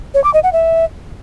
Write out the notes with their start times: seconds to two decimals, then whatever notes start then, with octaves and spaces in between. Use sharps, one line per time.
0.14 C#5
0.24 D6
0.34 D#5
0.43 F#5
0.53 E5